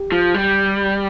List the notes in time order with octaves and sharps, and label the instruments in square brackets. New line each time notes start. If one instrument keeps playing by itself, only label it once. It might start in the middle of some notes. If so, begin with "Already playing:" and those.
Already playing: [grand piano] G4
[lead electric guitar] F3
G3